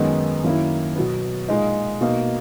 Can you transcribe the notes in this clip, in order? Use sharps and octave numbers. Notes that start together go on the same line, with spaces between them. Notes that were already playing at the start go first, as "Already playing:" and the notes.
Already playing: F#2 D#3 G#3 B3 D#4
F#2 D#3 A#3 E4
B2 F#3 B3
A#2 G#3 D#4
B2 A#3 D#4